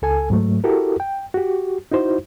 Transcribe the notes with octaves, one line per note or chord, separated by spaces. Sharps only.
C#2 A4 G#5
G#2 F#3 A3
E4 F#4 G4 A4 A#4
G5
F#4 G4
D#4 E4 F#4 C5